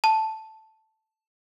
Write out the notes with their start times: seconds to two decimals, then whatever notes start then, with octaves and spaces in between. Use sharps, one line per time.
0.04 A5